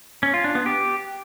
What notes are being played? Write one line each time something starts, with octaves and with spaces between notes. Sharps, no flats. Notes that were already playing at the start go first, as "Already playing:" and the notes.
C#4
F4
D4
B3
G4